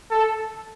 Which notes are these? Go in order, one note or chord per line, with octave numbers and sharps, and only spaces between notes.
A4